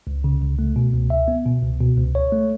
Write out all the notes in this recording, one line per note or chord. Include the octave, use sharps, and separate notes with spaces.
C#2
C#3
C#2
A3
B2
C#2
E5
B3
B2
C#2
B2
C#2
C#5
A3